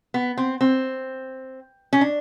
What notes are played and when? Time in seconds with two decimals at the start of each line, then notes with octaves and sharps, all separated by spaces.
0.14 B3
0.37 C4
0.61 C4
1.93 C#4
2.01 D4